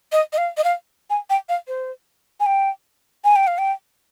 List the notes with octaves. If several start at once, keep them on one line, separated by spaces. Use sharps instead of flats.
D#5
D#5
F5
D#5
F5
G#5
G5
F5
C5
G#5
G5
G#5
G5
F5
G5